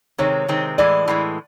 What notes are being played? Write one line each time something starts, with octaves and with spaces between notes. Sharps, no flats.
C3 D#3 G#3 C4 C#5
C3 D#3 G#3 C4
A2 E3 G#3 D5
A2 E3 G#3